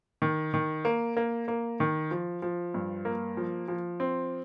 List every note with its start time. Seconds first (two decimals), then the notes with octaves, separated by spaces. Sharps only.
0.22 D#3
0.54 D#3
0.85 A#3
1.17 A#3
1.48 A#3
1.80 D#3
2.11 F3
2.42 F3
2.74 G2
3.05 A#3
3.37 F3
3.68 F3
4.00 C4